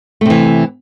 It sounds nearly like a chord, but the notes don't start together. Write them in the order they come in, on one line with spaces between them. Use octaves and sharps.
A3 C3 E3